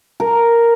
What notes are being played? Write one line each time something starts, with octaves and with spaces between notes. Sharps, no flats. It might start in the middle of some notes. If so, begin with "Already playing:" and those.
A#4